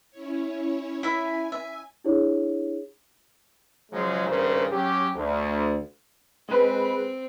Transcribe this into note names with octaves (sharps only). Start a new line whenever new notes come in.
C#4 E4 C#5
E4 E5 G#5
E5
D4 E4 G4 G#4 C#5
C#3 F3 F#3 G#3
G#1 G2 C#3 A#4 C5
F#3 C#4 G4
D2
G#3 C4 B4